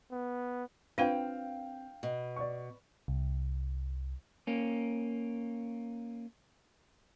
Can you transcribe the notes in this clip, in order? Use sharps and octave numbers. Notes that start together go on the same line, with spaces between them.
B3
C4 D4 F4 B4 F5 G5
B2
D5 C#6
C2
A#3 C#4